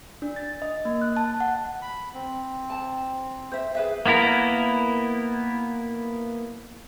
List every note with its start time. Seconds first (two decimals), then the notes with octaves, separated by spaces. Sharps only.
0.22 D4
0.36 A6
0.62 D#5
0.85 A#3
1.01 F#6
1.16 A5
1.40 F#5
1.82 B5
2.14 C4
2.70 A5
3.52 C5 E5
3.75 G#4 B4 E5
4.06 A#3 B3 E4 A#4